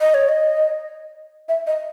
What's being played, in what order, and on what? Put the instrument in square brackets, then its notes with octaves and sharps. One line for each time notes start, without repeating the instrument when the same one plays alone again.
[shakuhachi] D#5
C#5
D#5
E5
D#5